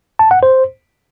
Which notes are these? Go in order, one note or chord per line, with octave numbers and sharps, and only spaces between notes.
A5
F#5
C5